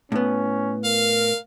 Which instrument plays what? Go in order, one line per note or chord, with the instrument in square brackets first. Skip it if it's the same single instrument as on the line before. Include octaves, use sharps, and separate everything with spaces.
[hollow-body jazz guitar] A2 B3 [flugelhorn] C#4
[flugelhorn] A#4 [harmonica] F5